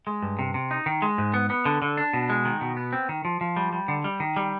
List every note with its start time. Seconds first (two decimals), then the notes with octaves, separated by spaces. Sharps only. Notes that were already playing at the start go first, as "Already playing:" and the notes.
0.07 G#3
0.22 G2
0.39 C3
0.54 C3
0.71 D#4
0.86 D#3
1.02 G#3
1.18 G#2
1.34 B3
1.50 B3
1.65 D3
1.82 D3
1.97 D4
2.13 B2
2.29 G#3
2.45 D#3
2.61 B2
2.77 B3
2.93 C4
3.09 D#3
3.25 F3
3.41 F3
3.57 G3
3.73 G3
3.88 D3
4.04 G3
4.20 D#3
4.36 G3